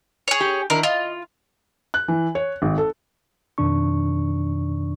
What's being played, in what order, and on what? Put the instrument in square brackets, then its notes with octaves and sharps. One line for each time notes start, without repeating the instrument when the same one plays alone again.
[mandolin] G#4 C#5
[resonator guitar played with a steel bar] G4
[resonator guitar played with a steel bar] D#3 D4 E4 [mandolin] A#4
[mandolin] F4 [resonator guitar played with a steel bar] D#5
[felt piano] F#6
E3
C#5
G#1
A4
[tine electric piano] F2 B2 D#3 D4 C#6